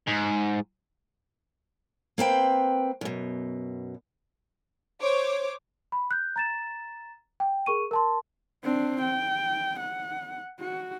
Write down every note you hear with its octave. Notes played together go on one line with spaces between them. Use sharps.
G#2
A#3 C4 B4 G5
F#2 B2
C5 C#5 D6
B5
F#6 G6
A#5 A6 E7
G5
G#4 A#4 C#6 D#7
A#4 A5 C6
C4 D4
G5
F#5
F#4